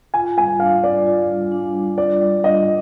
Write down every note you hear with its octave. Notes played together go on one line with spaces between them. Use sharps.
F4 G#5
G3 G#5
D4 F5
G3 D5
F4
G3
D4
G3
F4 D5
G3
D4 D#5